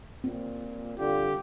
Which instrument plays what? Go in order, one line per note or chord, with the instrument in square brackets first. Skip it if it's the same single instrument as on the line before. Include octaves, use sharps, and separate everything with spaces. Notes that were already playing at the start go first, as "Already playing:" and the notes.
[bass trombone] A#2 [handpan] C4
[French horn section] G2 G3 F4 [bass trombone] D3 [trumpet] G4